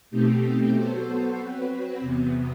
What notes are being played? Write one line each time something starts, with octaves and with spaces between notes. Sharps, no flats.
B2 A3 C4 D#4 G4
F#3 B3 F#4 A4 C5
F#3 C4 F#4 B4
E2 C3 F#3 B3